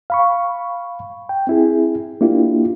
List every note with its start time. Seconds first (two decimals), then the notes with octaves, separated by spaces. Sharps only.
0.10 F5 B5 C#6
1.29 G5
1.47 C4 E4 G#4
2.21 A#3 D4 E4 F4 G4